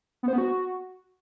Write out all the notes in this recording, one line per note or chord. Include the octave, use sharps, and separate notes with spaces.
B3
C5
B3
F#4